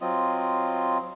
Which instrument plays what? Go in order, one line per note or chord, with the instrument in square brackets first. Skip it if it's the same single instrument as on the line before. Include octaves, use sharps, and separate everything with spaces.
[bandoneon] F#3 C4 F4 D#5